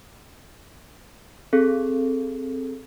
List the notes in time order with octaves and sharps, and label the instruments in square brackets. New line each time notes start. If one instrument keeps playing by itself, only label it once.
[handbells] C4 G#4 A4